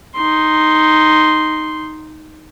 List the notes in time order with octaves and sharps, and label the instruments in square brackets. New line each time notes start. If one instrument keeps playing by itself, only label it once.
[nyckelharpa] D#4 C6